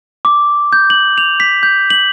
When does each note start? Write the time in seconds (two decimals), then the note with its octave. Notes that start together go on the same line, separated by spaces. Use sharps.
0.25 D6
0.73 G6
0.90 F#7
1.18 F7
1.40 B6
1.63 G6
1.90 F#7